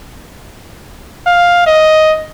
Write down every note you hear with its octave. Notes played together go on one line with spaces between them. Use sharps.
F5
D#5